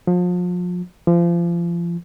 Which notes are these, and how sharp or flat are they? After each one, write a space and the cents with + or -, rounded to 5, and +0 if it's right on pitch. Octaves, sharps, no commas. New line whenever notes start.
F3 +35
F3 -30